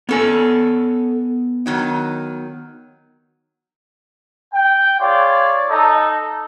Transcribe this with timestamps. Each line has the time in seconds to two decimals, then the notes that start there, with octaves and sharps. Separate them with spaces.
0.09 B3 C#4 A4 G#5
1.66 D#3 F#3 D#4
4.53 G5
5.00 F4 G#4 C#5 D5
5.70 D#4 A4